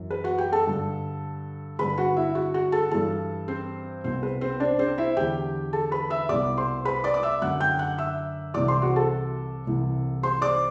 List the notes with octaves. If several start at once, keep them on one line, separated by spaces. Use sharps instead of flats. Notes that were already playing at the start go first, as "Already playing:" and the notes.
Already playing: F#2 E3
B4
F#4 F#5
G4 G5
A4 A5
G2 D3
G2 D3 B4 B5
F#4 F#5
E4 E5
F#4 F#5
F#4 F#5
A4 A5
G2 E3 A4 A5
C4 C5
C2 B2 C4 C5
B4
C4 C5
D4 D5
C4 C5
E4 E5
E2 D3 G4 G5
A4 A5
B4 B5
E5 E6
C2 B2 D5 D6
C5 C6
B4 B5
D5 D6
D6
E5 E6
F#2 D3 F#5 F#6
G5 G6
F#5 F#6
E5 E6
C2 C3 E3 D5 D6
C5 C6
F#4 F#5
A4 A5
C2 C3 E3
C5 C6
D5 D6